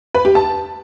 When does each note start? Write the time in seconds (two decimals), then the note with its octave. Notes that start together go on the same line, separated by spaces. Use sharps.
0.14 B4
0.25 G4
0.35 A5